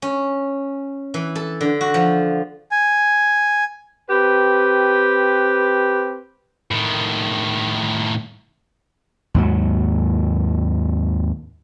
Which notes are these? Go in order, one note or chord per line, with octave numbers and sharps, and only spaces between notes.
C#4
E3
A4
D3
F#4
F3
G#5
C4 G4 B4
A2 D#3
D#2 G#2 F#3